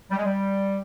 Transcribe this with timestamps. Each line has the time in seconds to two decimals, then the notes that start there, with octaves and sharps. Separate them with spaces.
0.11 G3
0.17 G#3
0.25 G3